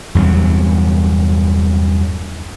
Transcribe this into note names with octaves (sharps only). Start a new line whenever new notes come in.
E2 G2 C3 F#3